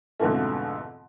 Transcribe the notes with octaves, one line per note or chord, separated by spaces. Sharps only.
F2 G#2 B2 D3 E3 A3